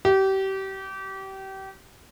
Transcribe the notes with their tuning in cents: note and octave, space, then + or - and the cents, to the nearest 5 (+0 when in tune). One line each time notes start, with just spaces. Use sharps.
G4 -30